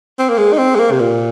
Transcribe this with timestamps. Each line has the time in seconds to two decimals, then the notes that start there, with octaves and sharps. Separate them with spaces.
0.19 C4
0.29 A#3
0.38 G#3
0.53 D#4
0.58 C4
0.75 G#3
0.79 A#3
0.91 C3
1.00 A#2